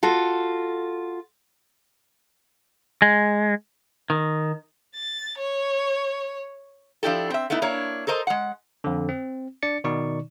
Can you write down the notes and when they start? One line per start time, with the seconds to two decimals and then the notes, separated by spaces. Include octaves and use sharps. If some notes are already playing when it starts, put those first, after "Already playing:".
0.03 F4 F#4 A4
3.02 G#3
4.10 D#3
4.95 A6
5.38 C#5
7.03 F3 D4 E4 G4 A4
7.30 C4 E5
7.50 A3 B3 D#4 E4
7.62 A#3 D4 E4 C#5
8.07 A4 A#4 C5 D#5
8.27 G#3 F#5
8.84 F2 D3
9.09 C4
9.63 D4 D5 A6 C#7
9.84 B2 D#3 D#4 D5 C#6